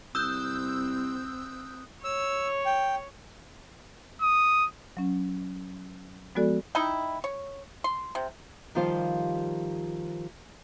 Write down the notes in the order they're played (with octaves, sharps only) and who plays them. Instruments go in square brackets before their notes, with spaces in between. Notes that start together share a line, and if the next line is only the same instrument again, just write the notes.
[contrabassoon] C2 [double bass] C4 [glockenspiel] D#6 F#6 [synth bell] E6 G6
[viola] C#5 [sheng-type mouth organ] E6
[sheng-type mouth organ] G5
[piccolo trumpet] D#6
[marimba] F#3 C#4
F3 G#3 B3 F#4 A4 D5
[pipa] D#4 E4 G5
C#5
C6
C3
[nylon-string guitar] D#3 F3 G3 F4 G4 C5